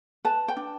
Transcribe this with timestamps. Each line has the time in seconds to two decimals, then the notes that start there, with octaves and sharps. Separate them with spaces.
0.25 B4 A5
0.48 G5
0.57 D4